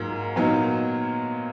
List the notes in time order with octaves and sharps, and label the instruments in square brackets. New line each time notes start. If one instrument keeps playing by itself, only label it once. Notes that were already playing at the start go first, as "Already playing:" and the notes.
Already playing: [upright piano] G#2 F#3 A#3 F4
A#2 F#3 B3 D#4 A#4